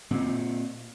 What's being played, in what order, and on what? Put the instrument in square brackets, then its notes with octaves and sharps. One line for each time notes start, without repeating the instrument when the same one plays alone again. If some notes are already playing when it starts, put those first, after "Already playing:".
[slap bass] A#2 C4